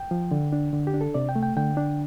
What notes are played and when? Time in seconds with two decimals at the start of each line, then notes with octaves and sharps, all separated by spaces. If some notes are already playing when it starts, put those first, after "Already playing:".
Already playing: G5
0.11 F3
0.31 D3
0.53 D4
0.73 D3
0.87 G4
0.94 D4
1.01 A4
1.14 C3 D5
1.29 G5
1.36 A3
1.43 G5
1.56 D3 G5
1.77 D4